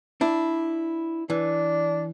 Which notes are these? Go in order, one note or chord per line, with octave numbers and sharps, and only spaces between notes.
D4 E4
E3 D4